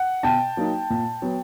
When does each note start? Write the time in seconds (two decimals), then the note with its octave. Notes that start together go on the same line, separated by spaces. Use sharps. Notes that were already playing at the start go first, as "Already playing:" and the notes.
Already playing: F#5
0.23 B2 G5 A5
0.57 F#3 A#3 D#4
0.90 A#2
1.22 F#3 B3